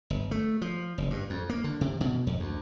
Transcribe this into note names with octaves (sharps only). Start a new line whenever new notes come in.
G1
A3
F3
F#1
G2
F2
A#3
D3
C3
B2
F2
D2